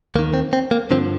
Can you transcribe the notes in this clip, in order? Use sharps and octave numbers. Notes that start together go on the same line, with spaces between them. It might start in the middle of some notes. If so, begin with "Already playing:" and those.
D#2 D#3 A#3
C4
C4
A#3
G2 D3 F3 C4